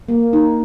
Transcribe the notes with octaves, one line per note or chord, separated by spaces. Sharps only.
A#3
D#4